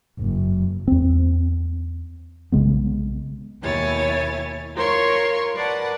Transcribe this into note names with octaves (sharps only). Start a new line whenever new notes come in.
F#1
E2 C4
B1 C#3 G#3 B3
D#2 B2 E4 C#5 G#5 A6
F4 A#4 C#5 C6 C#6
A#4 B4 D5 F#5 A5